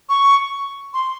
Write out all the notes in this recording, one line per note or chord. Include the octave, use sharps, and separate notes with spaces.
C#6
C6